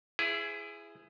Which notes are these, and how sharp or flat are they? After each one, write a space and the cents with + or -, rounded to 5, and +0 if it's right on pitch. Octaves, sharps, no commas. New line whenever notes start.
E4 +20 G#4 +0 C5 -35